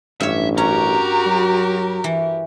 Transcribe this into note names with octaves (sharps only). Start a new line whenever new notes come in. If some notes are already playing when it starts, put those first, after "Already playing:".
A1 G2 C#5 E5
C#4 F#4 G4 A#4 A#5
F#3
E3